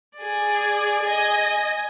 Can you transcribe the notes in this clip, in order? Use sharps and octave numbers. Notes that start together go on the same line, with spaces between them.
G#4 D5
D#5 G#5